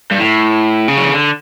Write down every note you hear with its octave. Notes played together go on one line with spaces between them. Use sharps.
G2
A2
C#3
F#3
E3
D3